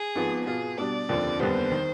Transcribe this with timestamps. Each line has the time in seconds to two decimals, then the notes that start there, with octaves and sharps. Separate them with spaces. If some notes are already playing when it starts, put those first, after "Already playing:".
Already playing: G#4
0.16 G#1 G#2 F3 B3
0.46 B2 B3 F4 G#4
0.78 B2 G3 D4 D5
1.09 F1 D#2 D3 F3 C4
1.40 F1 D#2 D3 G3 B3 C5
1.72 D#3